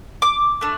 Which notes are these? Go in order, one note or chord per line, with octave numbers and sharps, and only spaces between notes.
D6
A3 D4